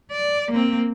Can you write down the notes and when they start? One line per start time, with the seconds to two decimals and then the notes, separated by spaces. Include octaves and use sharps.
0.11 D5
0.51 A#3 C4